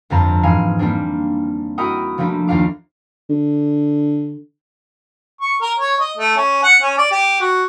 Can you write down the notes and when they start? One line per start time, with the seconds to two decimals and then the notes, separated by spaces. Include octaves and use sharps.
0.10 G1 F2 C4 A5 A#5
0.43 G#2 E3 G#3 F5 G#5
0.79 G3 A#3 C4 D4
1.78 E4 F#4 A#4 D#5 G5 D#6
2.18 F3 G3 A3 A#3 D4
2.48 D#2 G3 F4 F5 D6
3.30 D3
5.41 C#6
5.62 A#4
5.80 C#5
6.00 D#5
6.18 A3
6.37 C#4
6.63 F#5
6.82 C#4
6.98 D5
7.12 G4
7.41 F#4